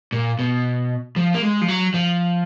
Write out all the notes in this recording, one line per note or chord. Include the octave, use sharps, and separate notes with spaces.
A#2
B2
F3
A#3
G#3
F3
F#3
F3